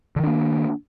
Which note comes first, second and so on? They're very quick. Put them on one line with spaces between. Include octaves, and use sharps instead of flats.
D3 D#3 D4 A#3